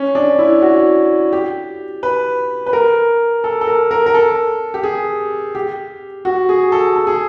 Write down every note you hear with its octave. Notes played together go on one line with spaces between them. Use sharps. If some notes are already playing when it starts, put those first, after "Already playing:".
Already playing: C#4
D4
E4
F#4
G4
B4
B4
A#4
A4
A4
A#4
A#4
A#4
A4
G4
G#4
G4
F#4
G#4
A4
A4
G#4